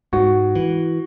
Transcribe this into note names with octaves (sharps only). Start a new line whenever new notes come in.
G#2 F#4
E3